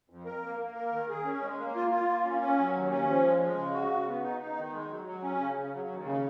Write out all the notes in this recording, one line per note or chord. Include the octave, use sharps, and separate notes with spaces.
F2
A#4
A#3
A#3
A#4
D#3
G#4
C#4
G#3
A#3
F4
F4
A#3
C#4
C#4
F#3
D#2
C#4
F3
G#3
G#3
C#3
F#4
C#3
B3
D#4
D#4
D#3
G#3
F#3
F#3
C#4
C#3
C#3
F#3
D#2
C#3